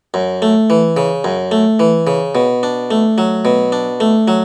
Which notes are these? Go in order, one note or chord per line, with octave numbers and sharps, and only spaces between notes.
F#2
A3
E3
C#3
F#2
A3
E3
C#3
B2
D4
A3
F#3
B2
D4
A3
F#3